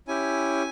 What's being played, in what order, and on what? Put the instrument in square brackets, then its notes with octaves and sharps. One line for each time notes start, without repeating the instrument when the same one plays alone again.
[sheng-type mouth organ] C#4 E4 G4 G#5